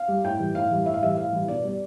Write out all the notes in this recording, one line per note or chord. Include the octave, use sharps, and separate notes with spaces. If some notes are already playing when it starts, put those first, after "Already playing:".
Already playing: F5
G3
A2 G5
E3 G3
A2 F5
E3 G3
A2 E5
F5
E3 G3 E5
A2 F5
E3 G3
B2 D5
G3 D5